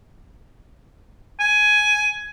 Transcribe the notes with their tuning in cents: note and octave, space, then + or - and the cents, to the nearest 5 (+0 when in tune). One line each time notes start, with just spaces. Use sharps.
G#5 +10